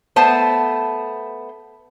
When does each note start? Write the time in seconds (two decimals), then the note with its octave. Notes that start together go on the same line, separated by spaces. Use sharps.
0.16 A3 B3 C5 A5